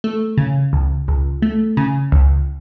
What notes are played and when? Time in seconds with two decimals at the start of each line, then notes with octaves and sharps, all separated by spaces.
0.04 A3
0.38 C#3
0.73 C#2
1.08 C#2
1.42 A3
1.77 C#3
2.12 C#2